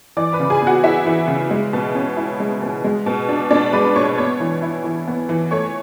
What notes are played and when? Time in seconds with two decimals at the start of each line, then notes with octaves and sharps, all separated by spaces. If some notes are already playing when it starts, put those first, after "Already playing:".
0.17 E3 D5 D6
0.33 B4 B5
0.40 C#3
0.50 G#4 G#5
0.62 B3
0.67 F#4 F#5
0.84 E4 E5
1.06 E3
1.28 C#3
1.51 G#3
1.73 B2
1.95 C#4
2.17 E4
2.40 G#3
2.62 B2
2.84 G#3
3.06 B2
3.29 D4
3.50 B2 D4 D5
3.73 G#3 B4 B5
3.96 B2 C#5 C#6
4.18 B3 C#5 C#6
4.40 E3
4.62 E4
4.84 E3
5.08 B3
5.29 E3
5.51 A3 C#5 C#6